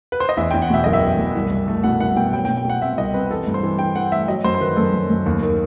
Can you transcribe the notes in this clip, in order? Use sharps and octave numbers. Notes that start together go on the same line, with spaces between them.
B4
C5
D#5
E2 E5
E2 G5
F#5
B2 E5
F#1 D#5
E5
F#1
F#1
C2
C2
A3
B2 F#5
C2 F#5
B2 G5
F#3 G5
G5
B2
G5
B2 F#5
C4 E5
C2 D#5
C4 B4
E3 A4
G2
C5
E3
E3 G5
E3 F#5
A3 E5
F#3 D#5
F#2 C5
C5
D#3 B4
F#2 A4
F#2
F#2
D#2
D#3